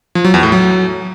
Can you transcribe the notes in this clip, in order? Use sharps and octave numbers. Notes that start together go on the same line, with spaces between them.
F3
F#3
E2
A2
F#3